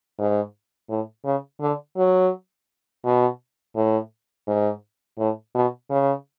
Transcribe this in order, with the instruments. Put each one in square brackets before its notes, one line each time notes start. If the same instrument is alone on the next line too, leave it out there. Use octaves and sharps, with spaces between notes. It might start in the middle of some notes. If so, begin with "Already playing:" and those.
[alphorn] G#2
A2
C#3
D3
F#3
B2
A2
G#2
A2
B2
C#3